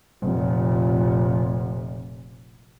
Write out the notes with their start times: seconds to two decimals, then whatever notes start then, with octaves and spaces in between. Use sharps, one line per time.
0.22 F1 A#2